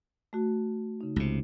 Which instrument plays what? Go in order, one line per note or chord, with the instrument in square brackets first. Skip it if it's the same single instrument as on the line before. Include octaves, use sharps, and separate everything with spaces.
[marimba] A3 F#4
C#3 D#4
[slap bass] C#2 C3